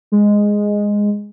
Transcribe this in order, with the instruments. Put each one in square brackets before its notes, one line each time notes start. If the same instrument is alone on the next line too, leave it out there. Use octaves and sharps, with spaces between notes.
[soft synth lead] G#3